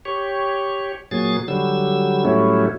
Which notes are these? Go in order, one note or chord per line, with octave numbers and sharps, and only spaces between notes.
G4 C#5
A#2 F#3 G#4 A6
D3 F#3 G3 E6
A2 F#3 G3 A3 C#4 E4